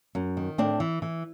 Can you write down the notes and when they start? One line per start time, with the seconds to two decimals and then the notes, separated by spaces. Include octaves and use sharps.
0.15 F#2
0.37 D#3
0.58 A2 C4 D4
0.80 E3
1.02 E3